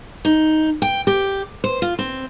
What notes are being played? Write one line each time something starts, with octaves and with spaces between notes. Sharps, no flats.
D#4
G5
G4
C5
F4
C4